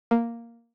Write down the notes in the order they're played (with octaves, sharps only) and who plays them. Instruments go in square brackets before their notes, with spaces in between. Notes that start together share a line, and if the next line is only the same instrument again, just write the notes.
[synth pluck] A#3